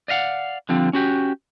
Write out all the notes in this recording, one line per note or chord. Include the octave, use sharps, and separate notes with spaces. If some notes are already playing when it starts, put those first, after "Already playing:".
D5 D#5 F5 F#5
D3 F3 G3 C4
C#4 F#4 G4